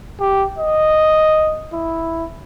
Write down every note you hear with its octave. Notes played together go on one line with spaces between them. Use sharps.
G4
D#5
E4